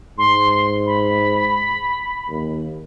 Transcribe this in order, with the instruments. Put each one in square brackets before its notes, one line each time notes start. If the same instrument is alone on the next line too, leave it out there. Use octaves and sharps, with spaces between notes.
[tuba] G#2 [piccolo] C6
[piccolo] B5
[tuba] D#2